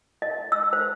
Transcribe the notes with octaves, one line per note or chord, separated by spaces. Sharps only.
D#5
E6
C5